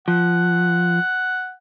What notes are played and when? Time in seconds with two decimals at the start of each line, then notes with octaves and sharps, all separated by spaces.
0.08 F3 F#5